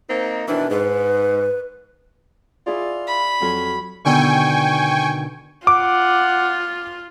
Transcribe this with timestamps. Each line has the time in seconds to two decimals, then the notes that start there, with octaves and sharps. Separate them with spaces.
0.08 A#3 C4 D#4
0.48 B2 D#3 E3 D4
0.71 G#2 B4
2.67 E4 F4 G#4 D5
3.07 B5
3.41 F2 F#3
4.05 B2 D3 D#3 G5 G#5 C#6
5.67 F4 F#5 D6